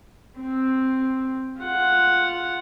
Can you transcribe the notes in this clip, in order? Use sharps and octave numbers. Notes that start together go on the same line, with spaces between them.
C4
F4 F#5